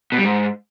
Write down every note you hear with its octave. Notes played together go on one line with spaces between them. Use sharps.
B2
G3
G#2